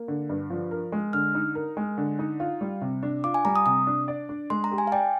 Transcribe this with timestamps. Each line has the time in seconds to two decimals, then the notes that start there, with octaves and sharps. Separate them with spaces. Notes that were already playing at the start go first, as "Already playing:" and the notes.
Already playing: A#3
0.08 D3
0.29 G2
0.50 F3
0.71 A#4
0.92 G#3
1.13 D3 F6
1.35 D#4
1.55 A#4
1.77 G#3
1.98 D3
2.19 D#4
2.40 F4
2.61 G3
2.81 C3
3.03 D4
3.24 F4 D6
3.34 G#5
3.45 G3 A#5
3.56 D#6
3.66 C3 D#6
3.87 D4
4.08 D5
4.29 D4
4.50 G#3 C6
4.64 A#5
4.71 G4
4.78 G#5
4.87 F5
4.92 D5 G5